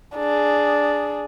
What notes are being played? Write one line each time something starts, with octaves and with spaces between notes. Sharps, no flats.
D4 G#4